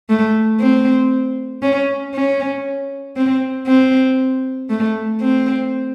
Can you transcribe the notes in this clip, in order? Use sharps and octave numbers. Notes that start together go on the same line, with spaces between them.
A3
C4
C#4
C#4
C4
C4
A3
C4